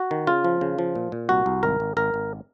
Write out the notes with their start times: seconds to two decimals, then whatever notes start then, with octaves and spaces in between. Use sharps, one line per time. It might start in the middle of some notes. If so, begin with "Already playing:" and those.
Already playing: F#4
0.11 D#3
0.27 C#3 F4
0.44 F3
0.61 C#3
0.79 F3
0.95 A#2
1.12 A#2
1.29 C2 F#4
1.46 C2
1.63 G#1 A#4
1.80 G#1
1.97 G#1 A#4
2.14 G#1